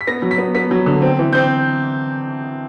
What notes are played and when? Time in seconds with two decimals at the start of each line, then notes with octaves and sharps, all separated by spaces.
0.01 B6
0.07 B3 A#6
0.22 F#3
0.31 B6
0.38 B3
0.55 B3 B6
0.71 F#3
0.86 D3
1.02 C4
1.19 E3
1.33 C4 G6